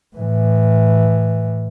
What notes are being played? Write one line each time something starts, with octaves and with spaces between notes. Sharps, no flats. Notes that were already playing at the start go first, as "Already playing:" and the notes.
A2 E3